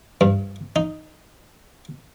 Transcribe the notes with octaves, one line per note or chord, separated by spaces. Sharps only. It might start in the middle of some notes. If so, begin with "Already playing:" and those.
G2
D#4